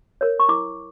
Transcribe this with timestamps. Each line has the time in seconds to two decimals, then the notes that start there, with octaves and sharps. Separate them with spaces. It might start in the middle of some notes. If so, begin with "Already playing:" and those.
0.21 A#4 C#5
0.40 C#6
0.49 E4 D6